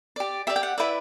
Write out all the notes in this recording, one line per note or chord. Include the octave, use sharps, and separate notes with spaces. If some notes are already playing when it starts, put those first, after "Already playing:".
G4 D5
G4 D5 E5
G5
F#5
E4 B4 D5 E5